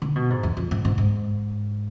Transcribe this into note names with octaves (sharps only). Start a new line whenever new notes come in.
D3
B2
G#2
E2
F2
G#2
G#2
G#2